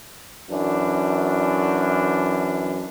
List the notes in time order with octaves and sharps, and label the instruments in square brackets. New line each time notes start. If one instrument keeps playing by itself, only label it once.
[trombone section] F#2 E3 D4